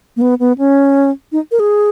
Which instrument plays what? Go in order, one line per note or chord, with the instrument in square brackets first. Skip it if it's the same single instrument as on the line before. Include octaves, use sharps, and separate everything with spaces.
[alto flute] A#3
B3
B3
C#4
D#4
A#4
G#4